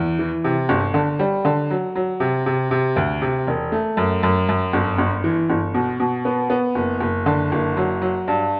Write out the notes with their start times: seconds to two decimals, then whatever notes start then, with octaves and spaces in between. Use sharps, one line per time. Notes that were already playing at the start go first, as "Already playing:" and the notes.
Already playing: E2
0.19 E3
0.44 C3
0.69 G1
0.94 D3
1.19 G3
1.45 D3
1.70 F#3
1.95 F#3
2.20 C3
2.46 C3
2.71 C3
2.96 D2
3.22 C3
3.47 E1
3.72 A3
3.97 F#2
4.23 F#2
4.49 F#2
4.73 G1
4.98 G1
5.24 E3
5.50 G1
5.74 B2
6.00 B2
6.25 B3
6.50 B3
6.75 F#1
7.00 F#1
7.26 D3
7.52 F#1
7.77 F#3
8.02 F#3
8.28 G2